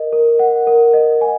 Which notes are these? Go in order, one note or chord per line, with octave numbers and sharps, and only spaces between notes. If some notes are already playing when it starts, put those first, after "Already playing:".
Already playing: A#4 D#5
A#4
F#5
A#4
D#5
G#5